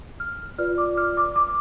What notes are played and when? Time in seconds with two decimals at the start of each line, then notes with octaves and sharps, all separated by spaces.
0.20 F6
0.58 F4 B4 D5 F6
0.78 D6
0.97 F6
1.17 D6
1.36 D6